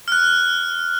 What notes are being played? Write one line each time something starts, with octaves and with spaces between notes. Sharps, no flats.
F6 F#6